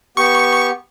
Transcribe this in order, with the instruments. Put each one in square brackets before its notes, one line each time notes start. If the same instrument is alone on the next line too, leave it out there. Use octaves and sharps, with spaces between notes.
[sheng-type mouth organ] B3 G4 [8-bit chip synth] C#6